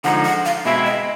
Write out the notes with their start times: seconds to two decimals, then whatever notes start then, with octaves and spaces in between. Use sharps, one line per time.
0.04 D3 F3 G#3 C4 D#4 F#5
0.24 F#5
0.46 F5
0.65 B2 G#3 C4 E4 E5
0.86 D#5